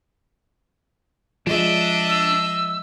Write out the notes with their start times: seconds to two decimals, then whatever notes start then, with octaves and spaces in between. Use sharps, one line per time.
1.47 F3 G#3 D4 D#5 E5
2.08 E6